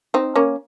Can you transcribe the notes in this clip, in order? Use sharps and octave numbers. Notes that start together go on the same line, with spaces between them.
C4 D#4
A#3 C#4